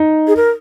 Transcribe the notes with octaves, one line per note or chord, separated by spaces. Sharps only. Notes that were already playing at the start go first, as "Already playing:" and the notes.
Already playing: D#4
G#4
A#4